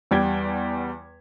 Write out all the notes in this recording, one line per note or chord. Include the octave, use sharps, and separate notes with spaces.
E2 G3 G5 G#6